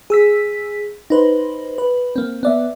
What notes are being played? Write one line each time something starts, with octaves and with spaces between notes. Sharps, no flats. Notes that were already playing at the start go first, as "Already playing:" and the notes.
G#4 E6 B6
D#4 B4 C5
B4
A#3 C4
B3 D5 E5